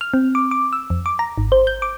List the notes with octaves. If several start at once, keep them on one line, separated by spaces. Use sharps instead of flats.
F6
C4
D6
D6
E6
F2
D6
A#5
G#1
C5
G6
D6